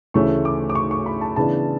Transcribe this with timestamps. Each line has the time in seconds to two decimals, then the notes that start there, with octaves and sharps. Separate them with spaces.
0.14 D2 C#3 E3 A3 C#4 C#6
0.45 D6
0.70 D6
0.75 C#6
0.91 C#6
1.06 B5
1.21 A5
1.36 C#3 E3 B3 D4 A5